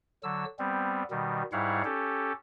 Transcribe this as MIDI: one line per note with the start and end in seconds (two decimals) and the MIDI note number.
0.23 0.45 50
0.23 0.45 54
0.23 0.45 88
0.59 1.03 55
0.59 1.03 59
0.59 1.03 60
1.11 1.43 47
1.11 1.43 51
1.11 1.43 55
1.53 1.82 44
1.53 1.82 55
1.53 1.82 64
1.53 1.82 73
1.53 1.82 77
1.53 1.82 78
1.84 2.33 61
1.84 2.33 67
1.84 2.33 69